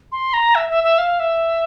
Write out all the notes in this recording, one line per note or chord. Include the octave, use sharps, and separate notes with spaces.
C6
A#5
E5
E5
E5
F5
E5